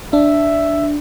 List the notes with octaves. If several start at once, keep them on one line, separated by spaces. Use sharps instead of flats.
D4 E5